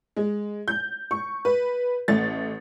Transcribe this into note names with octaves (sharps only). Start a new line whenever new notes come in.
G#3
G6
C#6
B4
A1 A3 A6